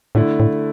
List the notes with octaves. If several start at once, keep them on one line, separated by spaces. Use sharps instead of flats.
A2 D3 A3 E4
A2